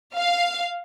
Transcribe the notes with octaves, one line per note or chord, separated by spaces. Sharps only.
F5